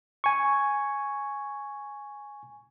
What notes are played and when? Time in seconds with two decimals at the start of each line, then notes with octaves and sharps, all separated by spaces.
0.24 G#5 C#6